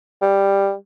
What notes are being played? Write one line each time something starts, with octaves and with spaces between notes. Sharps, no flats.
G3